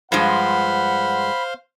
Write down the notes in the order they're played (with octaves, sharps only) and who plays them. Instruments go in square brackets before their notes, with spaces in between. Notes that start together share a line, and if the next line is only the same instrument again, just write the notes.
[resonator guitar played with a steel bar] G2 F3 G#3 [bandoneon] C5 F5 C6 [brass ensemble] F#5 [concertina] B5